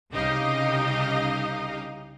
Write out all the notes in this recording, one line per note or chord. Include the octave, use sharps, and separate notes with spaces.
C2 C#3 D#4 G4 D#5 F5